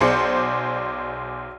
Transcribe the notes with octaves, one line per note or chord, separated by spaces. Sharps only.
B1 G#4 C5 D5 C#7